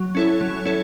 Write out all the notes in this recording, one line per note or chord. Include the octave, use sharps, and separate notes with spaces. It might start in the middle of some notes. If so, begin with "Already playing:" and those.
Already playing: F#3
C#4 E4 A4 C#5
F#3
C#4 E4 A4 C#5